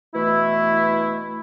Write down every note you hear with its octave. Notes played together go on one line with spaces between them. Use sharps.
B2 E3 A3 E4